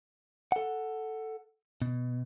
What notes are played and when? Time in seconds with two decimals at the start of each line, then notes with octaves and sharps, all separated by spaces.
0.52 A4 F#5
1.82 B2